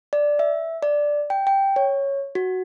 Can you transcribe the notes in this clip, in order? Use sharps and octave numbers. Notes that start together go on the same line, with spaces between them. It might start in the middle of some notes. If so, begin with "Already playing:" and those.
D5
E5
D5
G5
G5
C#5
F#4